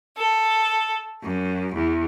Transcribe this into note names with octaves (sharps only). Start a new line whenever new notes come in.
A4
F#2
E2